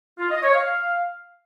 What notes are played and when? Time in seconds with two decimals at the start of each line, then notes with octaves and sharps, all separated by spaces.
0.19 F4
0.31 D#5
0.43 C#5
0.55 F5